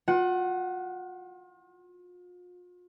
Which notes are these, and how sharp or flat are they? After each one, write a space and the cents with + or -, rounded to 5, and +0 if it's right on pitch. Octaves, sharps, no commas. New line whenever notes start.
F4 +40 F#5 +15